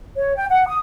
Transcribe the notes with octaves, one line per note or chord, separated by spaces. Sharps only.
C#5
G5
F#5
D#6